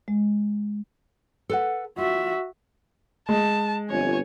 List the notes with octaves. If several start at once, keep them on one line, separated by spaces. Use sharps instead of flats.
G#3
A4 B4 F#5
F4 F#4 E5
G#3 A5
G1 F2 C#5 G#5